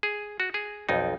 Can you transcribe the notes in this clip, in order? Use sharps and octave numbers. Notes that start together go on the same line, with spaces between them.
G#4
F#4
G#4
B1 F2 D#4